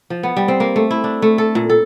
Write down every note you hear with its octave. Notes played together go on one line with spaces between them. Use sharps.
F3
B3
G3
C4
A#3
A3
E4
D4
A3
A4
A#2
A4